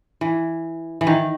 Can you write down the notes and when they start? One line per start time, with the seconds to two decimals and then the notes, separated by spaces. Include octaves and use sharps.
0.21 E3
1.01 E3
1.07 D#3